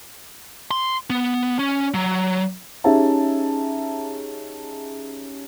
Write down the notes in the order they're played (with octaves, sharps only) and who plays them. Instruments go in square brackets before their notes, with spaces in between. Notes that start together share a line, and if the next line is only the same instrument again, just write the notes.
[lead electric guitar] C6
B3
C#4
F#3
[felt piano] C#4 D#4 G4 G#4 E5 A5